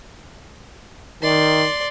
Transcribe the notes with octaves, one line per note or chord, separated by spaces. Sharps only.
D#3 D5 C6